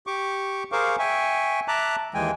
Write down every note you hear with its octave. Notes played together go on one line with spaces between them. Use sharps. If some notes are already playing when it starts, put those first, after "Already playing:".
G4 C#6 D6
G#4 A#4 C5 F5 C#6 D6
E5 G5 G#5 C#6
E5 A5 A#5 D6 F#6
D#2 E3 G#3 G5 G#5